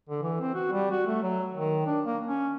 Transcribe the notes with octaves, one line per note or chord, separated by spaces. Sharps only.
D3
E3
C4
F#4
G3
F#4
A3
F#3
D#3
D4
A#3
C#4